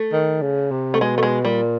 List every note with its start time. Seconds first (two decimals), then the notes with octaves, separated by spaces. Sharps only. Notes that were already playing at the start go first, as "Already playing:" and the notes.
Already playing: A3
0.13 D#3
0.42 C#3
0.71 C3
0.94 A3
1.00 B2 G#3
1.18 A3
1.23 G#3
1.45 A#2 G3